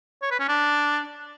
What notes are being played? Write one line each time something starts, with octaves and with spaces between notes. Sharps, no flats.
C#5
B4
C#4
D4